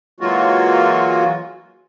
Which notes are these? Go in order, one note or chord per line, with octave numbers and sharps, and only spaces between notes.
E3 F#3 G#3 A#3 F4 F#4